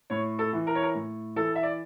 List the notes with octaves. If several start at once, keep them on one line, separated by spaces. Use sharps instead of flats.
A2 C#5
A4
E3
A#4
C#5
A#4
A2
E3 A4
E5
D5